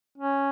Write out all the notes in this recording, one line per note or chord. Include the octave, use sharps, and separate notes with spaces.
C#4